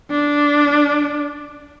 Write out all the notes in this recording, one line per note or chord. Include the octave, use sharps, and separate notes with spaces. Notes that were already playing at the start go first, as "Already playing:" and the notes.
D4